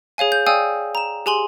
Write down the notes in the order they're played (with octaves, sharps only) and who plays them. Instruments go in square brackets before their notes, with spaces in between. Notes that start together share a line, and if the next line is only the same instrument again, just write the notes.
[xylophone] G#4 C#5 F5 G#5
G6
D5 F5 G5 G#5 D#6 E6
A#5 E7
G4 G#4 G#5 C6 F#7